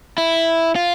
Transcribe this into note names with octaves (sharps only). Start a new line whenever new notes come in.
E4
F4